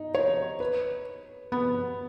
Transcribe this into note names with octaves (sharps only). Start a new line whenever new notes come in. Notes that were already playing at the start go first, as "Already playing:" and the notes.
Already playing: D#4
C#5
B4
B3